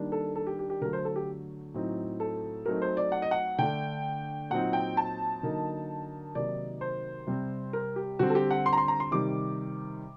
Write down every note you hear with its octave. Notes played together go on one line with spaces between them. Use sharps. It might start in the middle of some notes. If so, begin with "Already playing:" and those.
Already playing: D#3 G3 A#3 D4
A4
A4
G4
G4
G4
D3 F#3 A3 A#4
C5
A4
G4
A2 F#3 C4 D#4
A4
F#3 A3 C4 D#4 A#4
C5
D5
F#5
D#5
F#5
D3 A3 D4 G5
A#2 F#3 C4 D#4 F#5
G5
A5
D3 F#3 A#3 D#4
C3 D#3 F#3 A#3 D#4 D5
C5
C3 G3 C4
A#4
G4
D3 G3 C4 F#4
A4
G4
F#5
C6
A#5
C6
A#5
C6
C3 D#3 G3 D6